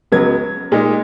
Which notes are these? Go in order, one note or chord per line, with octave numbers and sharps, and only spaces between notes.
C#2 C#3 F#3 B3 G#6
A#2 G#3 D#4